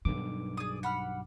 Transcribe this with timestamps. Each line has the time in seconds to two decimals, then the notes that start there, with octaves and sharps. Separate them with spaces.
0.05 B1 G2 D#3 D6
0.57 G#4 D5 D#6
0.83 F#5 B5 F6